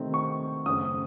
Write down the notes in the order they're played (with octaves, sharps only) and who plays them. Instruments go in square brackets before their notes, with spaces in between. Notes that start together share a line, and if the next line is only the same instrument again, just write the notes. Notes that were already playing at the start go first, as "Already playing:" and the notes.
Already playing: [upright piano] C3 D#3 A3 C4
C#6
F#2 C#3 A3 C4 D#6